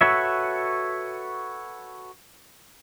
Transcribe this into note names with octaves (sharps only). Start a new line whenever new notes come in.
F#4 A4 B4 C#5 E5